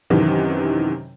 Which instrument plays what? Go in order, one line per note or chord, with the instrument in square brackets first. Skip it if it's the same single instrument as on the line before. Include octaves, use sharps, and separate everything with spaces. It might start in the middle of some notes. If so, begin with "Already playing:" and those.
[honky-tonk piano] F#2 C3 D#3 E3